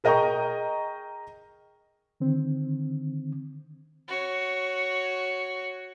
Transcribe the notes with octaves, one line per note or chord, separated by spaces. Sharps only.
G#4 A#4 D#5 G5 A#5 C#6
D3 D#3 C4
F#4 C#5